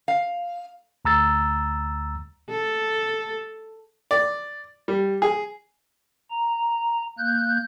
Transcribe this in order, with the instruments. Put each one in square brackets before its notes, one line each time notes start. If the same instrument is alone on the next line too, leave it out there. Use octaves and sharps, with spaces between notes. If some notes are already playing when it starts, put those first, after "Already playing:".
[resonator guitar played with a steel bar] F5
[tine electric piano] D2 A#5 E6 A6
[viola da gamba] A4
[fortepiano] D5
G3
G#4
[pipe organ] A#5
A#3 F#6 G6